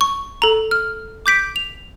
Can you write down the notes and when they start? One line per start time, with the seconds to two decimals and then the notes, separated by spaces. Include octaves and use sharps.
0.01 C#6
0.42 A4 A#5
0.71 F6
1.26 D6 G6 B6 D7
1.56 F7